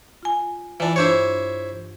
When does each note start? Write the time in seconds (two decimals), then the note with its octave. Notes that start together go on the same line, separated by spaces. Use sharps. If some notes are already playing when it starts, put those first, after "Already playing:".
0.23 F4 G#5
0.80 E3 D4 F4
0.96 G2 D4 E4 C5 C#5